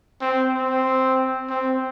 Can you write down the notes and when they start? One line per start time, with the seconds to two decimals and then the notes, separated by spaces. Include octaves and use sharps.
0.21 C4
0.54 C4
1.50 C4